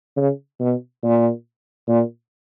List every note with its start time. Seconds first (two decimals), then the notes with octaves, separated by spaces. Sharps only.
0.17 C#3
0.60 B2
1.04 A#2
1.88 A#2